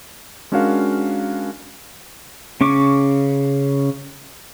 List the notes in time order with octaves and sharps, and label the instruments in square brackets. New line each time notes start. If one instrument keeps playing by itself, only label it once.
[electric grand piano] G#3 C#4 D4 F#4 A#4 F5
[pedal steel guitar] C#3 C#4 C#6 D6